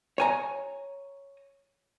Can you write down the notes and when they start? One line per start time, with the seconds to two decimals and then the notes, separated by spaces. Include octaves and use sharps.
0.18 C#5 G#5 A#5